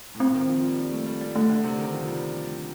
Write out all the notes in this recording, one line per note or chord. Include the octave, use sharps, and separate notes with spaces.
A2
A#2 C4
D#3
F3
G3
G3
A3
G3
G3
D3 A3
D3
C3
D#3
F3
G3